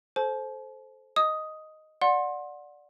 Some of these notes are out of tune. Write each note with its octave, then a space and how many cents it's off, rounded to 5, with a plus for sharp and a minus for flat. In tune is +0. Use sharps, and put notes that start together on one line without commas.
A4 -20 C5 +0 A5 -45
D#5 +0 D#6 +5
D5 +0 F#5 -20 C6 +25